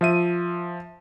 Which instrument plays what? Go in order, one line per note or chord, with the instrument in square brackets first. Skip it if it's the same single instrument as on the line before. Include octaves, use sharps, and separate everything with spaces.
[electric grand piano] F3 E5 D#7